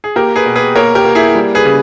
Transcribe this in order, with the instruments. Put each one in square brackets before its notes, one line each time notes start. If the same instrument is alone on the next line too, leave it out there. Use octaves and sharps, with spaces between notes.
[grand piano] G#4
A#3 G4 A#4
G#4 B4
B2
G#4 B4
A#3 A#4 C#5
G4 A#4
A#3
E4 G#4
G3
G#4 B4
C#3